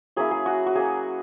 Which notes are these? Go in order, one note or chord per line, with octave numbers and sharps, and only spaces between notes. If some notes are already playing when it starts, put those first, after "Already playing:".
F#3 A#3 C#4 E4 G#4
G#4
F#4
F#4
F#3 A#3 C#4 G#4